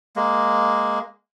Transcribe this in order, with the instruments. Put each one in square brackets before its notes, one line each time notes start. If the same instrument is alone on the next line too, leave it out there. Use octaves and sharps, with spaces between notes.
[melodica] G#3 A#3